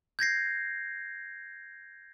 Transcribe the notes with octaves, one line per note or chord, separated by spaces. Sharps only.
G6 G#6 A#6 C7